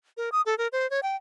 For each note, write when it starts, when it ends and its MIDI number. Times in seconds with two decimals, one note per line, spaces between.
0.17 0.30 70
0.32 0.41 87
0.46 0.57 69
0.58 0.68 70
0.72 0.89 72
0.90 1.00 73
1.03 1.16 79